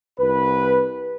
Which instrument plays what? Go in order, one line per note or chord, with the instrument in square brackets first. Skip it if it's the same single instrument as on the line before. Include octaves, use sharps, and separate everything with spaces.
[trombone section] C2 B4